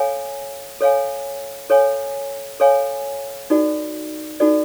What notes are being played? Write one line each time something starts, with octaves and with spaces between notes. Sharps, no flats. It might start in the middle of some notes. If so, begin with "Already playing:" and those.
Already playing: A4 C#5 F5 G#5
A4 C#5 F5 G#5
A4 C#5 F5 G#5
A4 C#5 F5 G#5
D#4 F#4 A4 D5
D#4 F#4 A4 D5